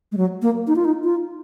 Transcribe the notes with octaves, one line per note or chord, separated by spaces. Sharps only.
G#3
F#3
A#3
D#4
F4
D#4
F4